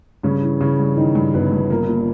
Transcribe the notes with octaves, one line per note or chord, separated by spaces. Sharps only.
G2 C#3 C#4
E3
C#3 E3 C#4
G2
D#3 E3 D#4
G2
G1 B3 B4
G2
A#2 A#3 A#4
A#2